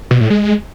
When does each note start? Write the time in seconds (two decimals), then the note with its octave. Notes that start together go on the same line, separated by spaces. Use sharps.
0.11 B2
0.21 A2
0.30 G#3